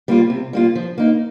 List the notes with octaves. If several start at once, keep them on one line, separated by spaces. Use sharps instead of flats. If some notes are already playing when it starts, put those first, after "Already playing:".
G3 A#3 F4
C3
G3 A#3 F4
F3
A#3 D#4